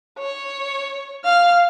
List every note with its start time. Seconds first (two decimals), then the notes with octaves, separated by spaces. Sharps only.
0.19 C#5
1.24 F5 F6